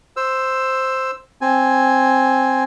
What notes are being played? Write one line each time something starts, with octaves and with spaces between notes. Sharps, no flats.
C5 E6
C4 G#5